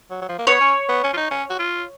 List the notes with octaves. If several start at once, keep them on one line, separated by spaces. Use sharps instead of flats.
F#3
F#3
F3
A#3
B3 C#5
C#4
B3
C#4
F4
D#4
C#4
F#4
F4